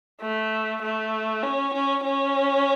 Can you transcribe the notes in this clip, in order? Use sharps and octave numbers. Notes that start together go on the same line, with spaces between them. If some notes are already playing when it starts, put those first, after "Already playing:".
A3
A3
C#4
C#4
C#4